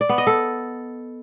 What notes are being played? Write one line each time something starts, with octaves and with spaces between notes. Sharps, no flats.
D5
B3
D#5
A4